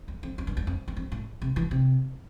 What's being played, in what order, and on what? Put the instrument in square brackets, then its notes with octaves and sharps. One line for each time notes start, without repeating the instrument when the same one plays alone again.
[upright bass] E2
F2
F2
G2
E2
F2
E2
F2
A2
C3
E3
C3